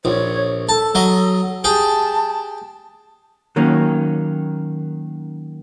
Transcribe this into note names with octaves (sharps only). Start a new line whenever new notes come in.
A#1 C#5
A4 A5
F#3 D#5
G4 G#4 A5
D#3 F#3 A#3 C#4